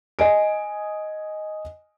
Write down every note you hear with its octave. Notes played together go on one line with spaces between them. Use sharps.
D#5 G#5 D7